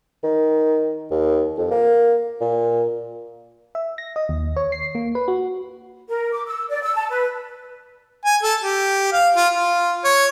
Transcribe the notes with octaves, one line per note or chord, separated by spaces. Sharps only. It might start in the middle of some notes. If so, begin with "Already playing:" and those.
D#3
D#2
F2
A#3
A#2
E5
A#6
D#5
D#2
C#5
C7
A#3
B4
F#4
A#4
D6
E6
D5
E6
A5
B4
G#5
A4
G4
F5
F4
F4
C#5